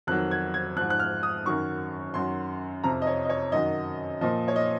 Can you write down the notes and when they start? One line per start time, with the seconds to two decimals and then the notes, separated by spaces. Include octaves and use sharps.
0.07 F2 F#6
0.10 D#3 F#3
0.31 G#6
0.54 G#6
0.76 F3 F#6
0.80 G#2
0.90 F#6
0.99 F6
1.23 D#6
1.46 F#2 D#3 F#3 C#6
2.14 F#2 D#3 F#3 C6
2.84 F2 C3 F3 A#5
3.02 D#5
3.07 C#5
3.25 D#5
3.29 C#5
3.52 F#2 D#3 F#3 D#5
4.21 A#2 F3 D#5
4.48 C#5
4.56 D#5